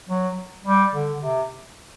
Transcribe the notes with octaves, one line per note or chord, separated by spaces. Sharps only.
F#3
G3
D3
C3